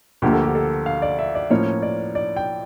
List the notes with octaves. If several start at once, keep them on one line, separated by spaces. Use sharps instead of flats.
D2 D3 F3 A#3 G4
A4
G4
A4
F5
D5
E5
D5
A2 F3 A#3 C#4 C#5
D5
D5
G5